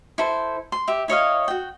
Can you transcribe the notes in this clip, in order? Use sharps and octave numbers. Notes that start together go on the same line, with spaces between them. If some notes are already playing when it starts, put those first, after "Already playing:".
E4 A4 C5
C6
G4 E5
E4 C#5 D#5 F5
F#4 G5